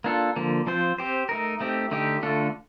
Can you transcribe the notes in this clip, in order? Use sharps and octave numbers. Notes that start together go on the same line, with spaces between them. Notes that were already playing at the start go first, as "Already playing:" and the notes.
A#3 D4 F4 A4
D3 F3 A#3
F3 C4 F4 C5
C4 G4 C5
A3 D#4 A#4
A3 C4 D#4 G4
D3 A3 D#4 G4
D3 A3 D4 F4 A4